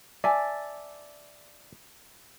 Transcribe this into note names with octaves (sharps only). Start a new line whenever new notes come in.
D5 E5 G#5 A5